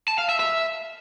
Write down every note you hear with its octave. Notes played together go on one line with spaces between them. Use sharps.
A5
F5
E5
E5